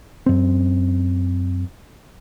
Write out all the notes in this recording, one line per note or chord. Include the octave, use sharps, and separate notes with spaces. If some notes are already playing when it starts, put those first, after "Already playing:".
F#2 C4